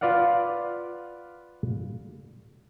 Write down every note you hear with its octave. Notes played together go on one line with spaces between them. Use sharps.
F4 B4 D5 F5 F#5